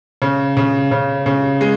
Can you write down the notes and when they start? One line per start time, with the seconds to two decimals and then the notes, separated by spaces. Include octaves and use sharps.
0.22 C#3
0.57 C#3
0.91 C#3
1.26 C#3
1.61 G#3